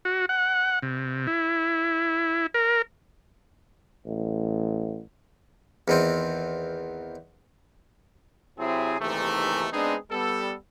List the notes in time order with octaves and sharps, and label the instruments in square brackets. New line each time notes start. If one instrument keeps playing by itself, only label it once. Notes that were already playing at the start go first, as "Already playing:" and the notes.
[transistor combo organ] F#4
F#5
C3
E4
A#4
[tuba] A1
[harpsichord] E2 D#3 C4
[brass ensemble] C3 F#3 C4 E4 G#4
D#2 G#2 C3 E3 A3
G#3 B3 C4 D4 D#4 G#4
G3 B3 A4